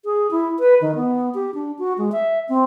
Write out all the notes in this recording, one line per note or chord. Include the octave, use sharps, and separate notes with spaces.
G#4
E4
B4
D#3
B3
G4
D4
F#4
G#3
E5
C4